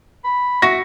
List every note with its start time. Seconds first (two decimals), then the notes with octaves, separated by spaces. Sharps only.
0.24 B5
0.62 F#4 E5 A#6